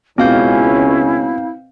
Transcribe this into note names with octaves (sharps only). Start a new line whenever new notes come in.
C#2 B2 C4 C#4 E4 F5 G6